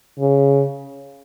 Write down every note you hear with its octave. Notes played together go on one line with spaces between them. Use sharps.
C#3